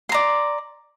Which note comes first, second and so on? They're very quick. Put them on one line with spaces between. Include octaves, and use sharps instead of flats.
C6 A#5 D5